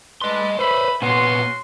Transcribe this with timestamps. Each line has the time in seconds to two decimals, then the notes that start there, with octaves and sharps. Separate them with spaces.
0.22 D4 A4 B4 D#5 C6
0.59 B4 C5 E5 B5
1.02 A#2 B3 C#4 F#4 C6